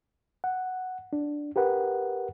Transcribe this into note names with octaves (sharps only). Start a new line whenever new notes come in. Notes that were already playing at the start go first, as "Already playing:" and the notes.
F#5
D4
G4 A#4 B4 F#5